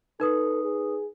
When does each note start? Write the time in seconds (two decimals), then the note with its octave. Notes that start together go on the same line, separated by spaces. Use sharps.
0.20 D#4 A4 B4 D#6
0.64 G#4